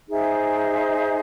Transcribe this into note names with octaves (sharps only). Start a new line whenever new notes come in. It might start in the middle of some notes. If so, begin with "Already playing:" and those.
D#4 G#4 C5 E5